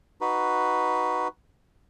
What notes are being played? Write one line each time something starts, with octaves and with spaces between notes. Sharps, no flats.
D#4 F#4 B4